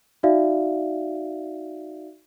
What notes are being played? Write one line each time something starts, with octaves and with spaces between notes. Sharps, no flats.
D#4 F#4 D5 E5 F5